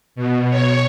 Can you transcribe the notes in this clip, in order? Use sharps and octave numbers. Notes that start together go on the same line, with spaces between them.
B2
C#5